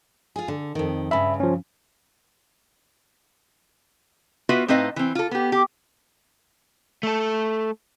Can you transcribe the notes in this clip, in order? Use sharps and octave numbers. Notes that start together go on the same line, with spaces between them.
F4 G#4
D3
F2 D#3
G2 C#3 E5 B5
F3 C#4
B3 F4 F#4 B4 E5 F5
A2 C4 D#4 B4 D#5 F5
E3 C4
F4 A4
B3 G4
G4
A3 A4